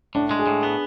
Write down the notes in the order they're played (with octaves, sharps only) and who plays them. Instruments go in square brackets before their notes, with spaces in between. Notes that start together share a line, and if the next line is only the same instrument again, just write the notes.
[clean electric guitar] A2 [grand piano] D4
[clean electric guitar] G#3
[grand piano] G#4
[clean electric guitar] A2
B3